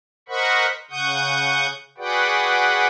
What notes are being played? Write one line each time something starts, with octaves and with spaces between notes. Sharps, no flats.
A#4 C5 D#5 F#5 B5 C#6
C#3 F#5 C#6 D#6 G6
F#4 G#4 B4 D5 F#5 G5